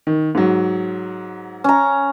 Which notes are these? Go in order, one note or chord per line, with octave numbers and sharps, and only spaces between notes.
D#3
G#2 F#3
C#4 A#5